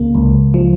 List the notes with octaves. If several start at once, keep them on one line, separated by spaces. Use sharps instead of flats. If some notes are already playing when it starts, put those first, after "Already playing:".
Already playing: C#2 C#3 A#3
C#2
F3